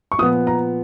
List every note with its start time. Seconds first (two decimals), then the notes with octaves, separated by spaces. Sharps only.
0.12 C#6
0.18 A#2 F3 B3 D#6
0.47 A#5